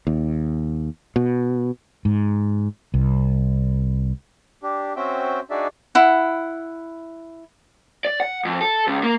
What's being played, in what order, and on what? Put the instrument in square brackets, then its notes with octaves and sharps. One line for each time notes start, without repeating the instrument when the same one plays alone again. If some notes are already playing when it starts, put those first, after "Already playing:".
[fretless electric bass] D#2
B2
G#2
C2
[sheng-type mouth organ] D4 G4
C4 C#4 F#4 C5 E5 G5
D4 D#4 F#4 G#4 D5 E5
[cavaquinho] E4 F#5
[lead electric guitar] D5
F#5
F2
A4
C#2
A#3